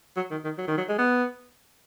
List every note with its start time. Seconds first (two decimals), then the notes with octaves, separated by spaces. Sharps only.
0.16 F#3
0.31 D#3
0.44 D#3
0.58 F#3
0.68 D#3
0.78 F#3
0.89 G#3
0.98 B3